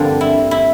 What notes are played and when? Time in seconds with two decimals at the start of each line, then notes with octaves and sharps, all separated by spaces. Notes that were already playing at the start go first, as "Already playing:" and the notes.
Already playing: G2 D3 F3 A#3 C4 D4
0.21 E4
0.51 E4